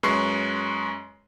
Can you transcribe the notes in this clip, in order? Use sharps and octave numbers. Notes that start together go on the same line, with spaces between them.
F#2 G#3 B4 C6 C#6 C7